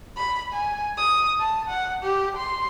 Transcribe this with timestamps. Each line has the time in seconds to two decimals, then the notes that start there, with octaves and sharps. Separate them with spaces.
0.17 B5
0.53 G#5
0.97 D#6
1.39 A5
1.69 F#5
2.03 G4
2.37 C6